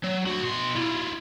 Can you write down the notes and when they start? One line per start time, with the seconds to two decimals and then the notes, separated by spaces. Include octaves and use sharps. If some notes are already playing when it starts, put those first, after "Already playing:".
0.04 F#3
0.26 D2 F#4
0.43 B2 C6
0.75 E4 F4